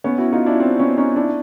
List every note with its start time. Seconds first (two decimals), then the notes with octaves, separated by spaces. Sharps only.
0.04 B3 C#4
0.18 E4 F#4
0.32 D#4 F4
0.46 D4 E4
0.60 C4 D4
0.79 B3 C#4
0.97 C#4 D#4
1.16 D4 E4